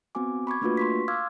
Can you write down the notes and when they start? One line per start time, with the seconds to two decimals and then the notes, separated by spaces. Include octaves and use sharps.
0.15 B3 C4 F#4 G#5 D6
0.47 B5 C#6 D6 G#6
0.62 A3 A#3 D4 F4 F#4 B4
0.77 C6 C#6 B6
1.08 F5 C6 D6 E6 F6 G#6